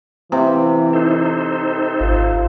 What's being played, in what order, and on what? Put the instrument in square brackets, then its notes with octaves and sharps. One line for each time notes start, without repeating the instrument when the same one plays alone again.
[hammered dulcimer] C3 [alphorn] E3
[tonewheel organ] D#4 A4 C5
[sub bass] G#1 [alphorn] F4